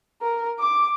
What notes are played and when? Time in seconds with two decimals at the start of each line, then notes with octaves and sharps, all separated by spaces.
0.22 A#4
0.59 D6